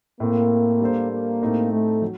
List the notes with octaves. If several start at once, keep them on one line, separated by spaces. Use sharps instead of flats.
A2 A3 A#3 C4
G3 D4 A4 C5
A#3
A2 A3 C4 D#4 G4
A3
F#3